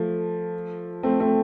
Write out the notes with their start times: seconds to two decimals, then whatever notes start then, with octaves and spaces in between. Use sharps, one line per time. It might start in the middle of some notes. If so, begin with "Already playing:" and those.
Already playing: F3 A3
1.03 A3 C4
1.20 A3 C4